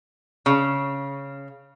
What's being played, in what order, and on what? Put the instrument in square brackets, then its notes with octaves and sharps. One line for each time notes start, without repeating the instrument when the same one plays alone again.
[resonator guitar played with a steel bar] C#3